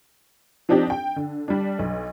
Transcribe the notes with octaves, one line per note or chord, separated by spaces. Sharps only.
F3 C4 D4 D#4 G4
G5
D3
G3 D4
B1